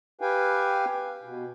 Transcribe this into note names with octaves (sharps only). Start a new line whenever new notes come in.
G4 B4 F5 G5 G#5
B2